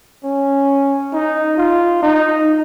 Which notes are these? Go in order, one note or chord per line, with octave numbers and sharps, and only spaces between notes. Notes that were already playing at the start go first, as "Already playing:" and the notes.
C#4
D#4
F4
D#4